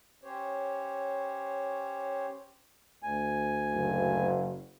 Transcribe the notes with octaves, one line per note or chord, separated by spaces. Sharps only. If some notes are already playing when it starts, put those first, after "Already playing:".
C#4 G4 C5 C#5
D2 G#5
F#1